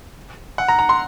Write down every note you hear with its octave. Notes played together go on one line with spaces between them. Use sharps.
F#5
A#5
A#5
C6